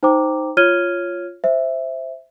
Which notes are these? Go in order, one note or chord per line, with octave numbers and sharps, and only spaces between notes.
D#4 C5 G5 A#5 D6
F4 C#5 F6 G#6 D#7 G7
C5 E5